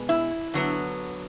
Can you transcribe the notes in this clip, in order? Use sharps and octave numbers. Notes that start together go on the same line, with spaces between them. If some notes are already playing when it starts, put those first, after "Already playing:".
Already playing: B2 G#3 B3
E4
D3 F#3 B3